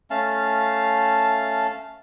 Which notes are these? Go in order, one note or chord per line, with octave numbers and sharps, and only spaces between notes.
A3 C#4 F5 A5